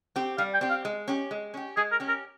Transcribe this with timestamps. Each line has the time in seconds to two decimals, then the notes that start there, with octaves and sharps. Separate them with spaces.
0.16 C4 G4
0.38 G3 F5
0.54 G5
0.61 C4 G4
0.70 F5
0.85 G#3
1.08 C#4 G4
1.31 G#3
1.54 C#4 G4
1.77 G#3 G#4
1.92 A#4
2.00 C#4 G4
2.08 A#4